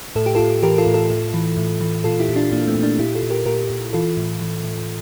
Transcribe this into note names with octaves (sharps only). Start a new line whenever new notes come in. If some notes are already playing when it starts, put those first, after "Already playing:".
A2 A4
G4
A2 F4 A4
E3 G4 A#4
F4 A4
A2
F4 A4
A2
E3
A2
E3
A#2 F4 A4
E4 G4
A#2
D4 F4
A#2 A#3 D4
A3 C4
A#2
A#3 D4
A#2 E4 G4
F4 A4
A#2
G4 A#4
A#2 G4 A#4
A#2
E3 F4 A4
A2
E3
A2